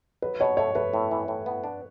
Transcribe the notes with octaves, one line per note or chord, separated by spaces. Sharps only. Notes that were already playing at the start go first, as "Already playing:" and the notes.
F#3 B4
B2 C#5
A3 C#5
A3 B4
A2
E3
A2
B3
D4